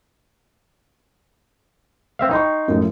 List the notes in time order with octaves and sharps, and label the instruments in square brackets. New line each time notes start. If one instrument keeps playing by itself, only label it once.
[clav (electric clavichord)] C4 E5 F5
[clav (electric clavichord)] D#4 [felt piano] G5 C6 C#6
[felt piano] F#2 A2 F3